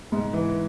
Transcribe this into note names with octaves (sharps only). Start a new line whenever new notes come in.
G#2
E3